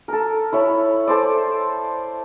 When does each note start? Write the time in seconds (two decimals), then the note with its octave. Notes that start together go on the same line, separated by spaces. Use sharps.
0.08 A4 A#4
0.53 E4 C#5 B5
1.08 A4 C5 D5